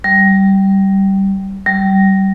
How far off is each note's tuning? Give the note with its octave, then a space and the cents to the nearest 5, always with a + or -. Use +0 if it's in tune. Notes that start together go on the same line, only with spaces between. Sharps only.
G3 -15
G3 -25